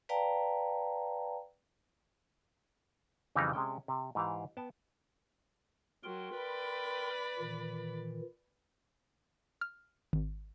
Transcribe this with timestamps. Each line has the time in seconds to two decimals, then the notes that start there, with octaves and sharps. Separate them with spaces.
0.09 B4 D5 F5 G5 A5 A#5
3.35 F2 C#3 E3 G3 D#4 A#5
3.53 C3 G#3 C#4 G5
3.88 C3
4.15 G#2 E3 G4 F5
4.57 B3 G5 A5
6.04 F#3 A#4 G5 C6
6.36 B4 D5 B5
7.38 A#2 D#3 E3
9.61 F6
10.13 G#1